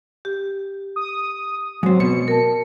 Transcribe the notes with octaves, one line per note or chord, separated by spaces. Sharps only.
G4
D#6
G#2 F#3 C4
B2 C#7
A#4 A5